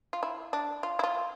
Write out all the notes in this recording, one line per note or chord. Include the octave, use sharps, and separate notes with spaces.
F4
E4
D4
F4
E4
F4